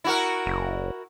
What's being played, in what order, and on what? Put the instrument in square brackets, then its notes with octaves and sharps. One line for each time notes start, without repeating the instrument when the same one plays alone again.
[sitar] E4 F#4 A#4
[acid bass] F#1